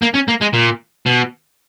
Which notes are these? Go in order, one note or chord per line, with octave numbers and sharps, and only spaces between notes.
A#3
C#4
A#3
G#3
A#2
B2